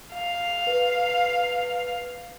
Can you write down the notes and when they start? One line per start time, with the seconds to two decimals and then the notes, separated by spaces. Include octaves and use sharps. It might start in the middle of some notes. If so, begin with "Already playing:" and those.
0.14 F5
0.67 B4